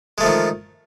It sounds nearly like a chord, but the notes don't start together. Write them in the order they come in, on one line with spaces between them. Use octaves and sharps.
G#3 A3 F3 D#3